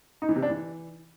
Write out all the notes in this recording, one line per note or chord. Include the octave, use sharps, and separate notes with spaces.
D#4
E3
C3
D4
E3